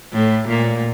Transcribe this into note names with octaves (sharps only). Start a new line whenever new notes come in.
A2
A#2